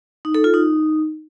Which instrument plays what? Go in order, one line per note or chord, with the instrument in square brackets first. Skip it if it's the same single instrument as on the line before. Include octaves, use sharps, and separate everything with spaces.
[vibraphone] D#4
A4
F4
D#4